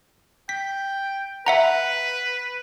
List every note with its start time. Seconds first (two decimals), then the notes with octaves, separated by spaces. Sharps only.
0.49 G5 B6
1.46 B4 E5 F#5 A#5